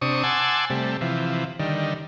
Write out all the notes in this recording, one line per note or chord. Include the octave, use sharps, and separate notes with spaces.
C3 D4 C#6 D#6
F#5 G#5 A5 C6 D6 E6
C3 G3 A3
C3 E3 F3
D3 D#3 G3